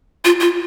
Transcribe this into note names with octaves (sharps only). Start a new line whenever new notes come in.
F4
F4